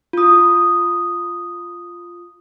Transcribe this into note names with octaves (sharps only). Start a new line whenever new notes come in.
F4 D#6